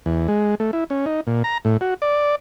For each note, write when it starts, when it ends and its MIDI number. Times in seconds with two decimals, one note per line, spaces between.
0.06 0.28 40
0.28 0.55 56
0.60 0.71 57
0.73 0.84 64
0.90 1.05 61
1.06 1.21 63
1.27 1.43 46
1.44 1.58 82
1.65 1.77 45
1.81 1.94 66
2.02 2.35 74